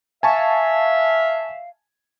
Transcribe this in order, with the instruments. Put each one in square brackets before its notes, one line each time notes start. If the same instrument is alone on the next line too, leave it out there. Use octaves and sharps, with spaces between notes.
[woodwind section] E5 F5 [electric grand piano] G#5 A5 C#6